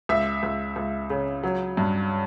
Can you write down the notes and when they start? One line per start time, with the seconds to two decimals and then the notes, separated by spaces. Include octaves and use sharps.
0.09 C#2 E5
0.43 C#2
0.76 C#2
1.10 C#3
1.43 F#3
1.77 G2